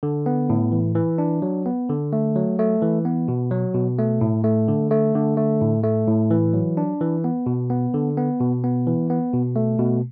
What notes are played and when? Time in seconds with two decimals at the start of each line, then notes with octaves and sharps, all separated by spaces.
0.03 D3
0.26 B3
0.49 A2
0.72 E3
0.95 E3
1.18 D4
1.42 F#3
1.66 B3
1.89 D3
2.13 A3
2.36 F#3
2.59 A3
2.82 E3
3.05 B3
3.28 B2
3.51 F#3
3.74 B2
3.99 A3
4.21 A2
4.44 A3
4.68 D3
4.91 A3
5.15 D3
5.37 A3
5.61 A2
5.84 A3
6.07 A2
6.31 E3
6.53 F#3
6.77 D4
7.01 E3
7.24 B3
7.46 B2
7.70 B3
7.94 D3
8.17 B3
8.40 B2
8.64 B3
8.87 E3
9.10 B3
9.33 B2
9.56 A3
9.79 B2